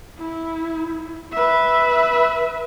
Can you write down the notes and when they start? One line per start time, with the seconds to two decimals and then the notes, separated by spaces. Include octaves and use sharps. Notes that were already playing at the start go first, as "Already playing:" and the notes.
0.18 E4
1.32 B4 E5